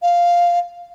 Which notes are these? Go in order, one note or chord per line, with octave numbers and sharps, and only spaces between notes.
F5